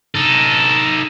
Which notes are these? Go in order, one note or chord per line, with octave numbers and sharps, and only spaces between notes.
D#4 A4